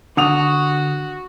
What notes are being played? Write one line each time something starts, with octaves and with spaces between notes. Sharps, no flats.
D3 F#4 F#5 D#6 F7